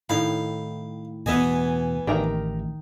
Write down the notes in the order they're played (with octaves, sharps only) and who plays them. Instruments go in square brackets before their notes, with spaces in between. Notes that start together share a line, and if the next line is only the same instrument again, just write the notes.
[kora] A2 D#3 E4 [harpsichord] F5
[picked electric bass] E2 B2 [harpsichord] E3 B3 G#5 [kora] D#5 E5
[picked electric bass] A1 [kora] D#3 [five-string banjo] G4 A#4 E5